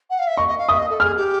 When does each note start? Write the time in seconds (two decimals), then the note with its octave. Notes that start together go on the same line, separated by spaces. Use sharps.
0.10 F#5
0.19 F5
0.27 E5
0.37 D#5 C#6
0.47 D#5
0.58 F5
0.69 E5 D#6
0.79 D#5
0.90 A4
1.00 G#4 F6
1.17 G4